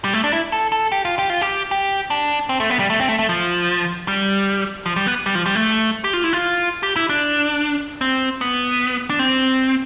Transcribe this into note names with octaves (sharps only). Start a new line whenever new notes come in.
G3
A3
D4
E4
A4
A4
G4
F4
G4
F4
G4
G4
D4
C4
A3
B3
G3
A3
C4
A3
A3
F3
G3
F3
G3
B3
G3
F3
G3
A3
G4
F4
E4
F4
G4
E4
D4
C4
B3
D4
C4